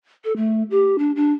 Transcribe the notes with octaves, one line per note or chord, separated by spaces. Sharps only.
A4
A3
G4
D4
D4